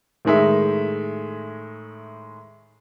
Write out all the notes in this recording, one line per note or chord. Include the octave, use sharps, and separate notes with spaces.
A2 D#3 G#3 E5